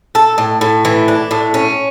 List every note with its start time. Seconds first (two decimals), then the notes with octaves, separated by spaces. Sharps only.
0.15 A4
0.38 A2
0.61 A2
0.85 E3
1.08 D4
1.31 A2
1.54 C#4